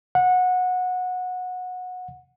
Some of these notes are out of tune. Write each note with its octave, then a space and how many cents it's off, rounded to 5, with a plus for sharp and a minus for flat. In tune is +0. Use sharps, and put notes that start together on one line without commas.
F#5 -20